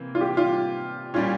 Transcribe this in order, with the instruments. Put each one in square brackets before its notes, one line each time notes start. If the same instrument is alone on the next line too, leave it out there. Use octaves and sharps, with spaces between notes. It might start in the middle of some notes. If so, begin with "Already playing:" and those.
Already playing: [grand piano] C3 E3 A#3
[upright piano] F4
G4
F4
[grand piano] A#2 G3 C#4 [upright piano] F4